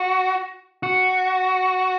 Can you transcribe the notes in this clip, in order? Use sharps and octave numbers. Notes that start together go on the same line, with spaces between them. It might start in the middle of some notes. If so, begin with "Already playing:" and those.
Already playing: F#4
F#4